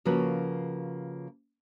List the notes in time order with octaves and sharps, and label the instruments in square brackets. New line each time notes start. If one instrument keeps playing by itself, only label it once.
[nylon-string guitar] C#3 F3 A#3 F#4 B4 C#5